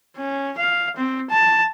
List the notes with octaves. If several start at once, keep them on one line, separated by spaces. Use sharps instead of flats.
C#4
F5
C4
A5